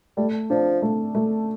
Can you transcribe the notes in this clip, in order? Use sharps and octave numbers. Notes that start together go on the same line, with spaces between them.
G3 A3
F3 D4
A3
A3